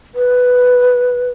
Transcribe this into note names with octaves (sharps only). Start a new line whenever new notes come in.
B4